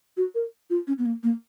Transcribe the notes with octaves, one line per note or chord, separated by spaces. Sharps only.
F#4
A#4
F4
C#4
B3
A#3
A#3